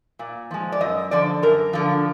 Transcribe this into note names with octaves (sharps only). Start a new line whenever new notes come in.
A#2
F3 G#3
D5
F#2 D#5
D3 F3 D5
F#2 A#4
D3 F3